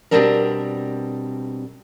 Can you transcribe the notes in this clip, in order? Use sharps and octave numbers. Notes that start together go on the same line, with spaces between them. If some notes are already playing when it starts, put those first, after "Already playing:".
B2 F#3 G3 C4 D4 A#4